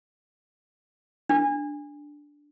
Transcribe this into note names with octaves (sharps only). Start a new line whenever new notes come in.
D4